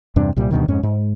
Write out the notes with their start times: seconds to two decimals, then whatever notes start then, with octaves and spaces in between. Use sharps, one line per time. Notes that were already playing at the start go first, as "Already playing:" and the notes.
0.16 E2 G2 C3 D4
0.36 C2 A#2 G3
0.51 D2 G2 B2 D#3
0.68 F2 G#2 C#4
0.83 G#2